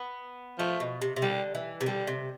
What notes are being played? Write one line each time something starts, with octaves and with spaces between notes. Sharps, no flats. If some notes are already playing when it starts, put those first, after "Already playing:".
Already playing: B3
F3 A3
B2
C3
C3
D3 G3
E3
C3
D3 G3
C3